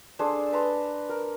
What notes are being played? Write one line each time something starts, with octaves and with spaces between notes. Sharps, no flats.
D4 G#4 A4 C5
B4 A5 A#5 C6
A#4